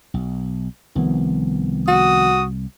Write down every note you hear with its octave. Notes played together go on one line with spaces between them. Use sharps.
B1
C2 D#3 F3 B3
F#4 D#6